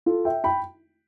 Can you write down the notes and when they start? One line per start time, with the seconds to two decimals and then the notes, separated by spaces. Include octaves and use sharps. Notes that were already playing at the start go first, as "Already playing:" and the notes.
0.06 F4 A4
0.25 E5 G5
0.44 G5 B5